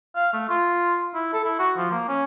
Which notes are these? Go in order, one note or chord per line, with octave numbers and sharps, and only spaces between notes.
F5
A3
F4
E4
A4
E4
F#4
F3
A#3
C#4